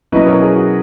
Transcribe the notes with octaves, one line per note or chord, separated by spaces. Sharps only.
B2 F#3 C#4 E4 B4 D#5
A#4 C#5
G#4
F#4